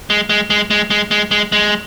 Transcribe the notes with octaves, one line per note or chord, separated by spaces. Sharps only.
G#3
G#3
G#3
G#3
G#3
G#3
G#3
G#3